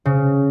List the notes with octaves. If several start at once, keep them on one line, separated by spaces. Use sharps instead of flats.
C#3